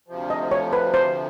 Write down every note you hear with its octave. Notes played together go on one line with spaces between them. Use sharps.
D2 C3 F3
D#5
C#5
B4
C5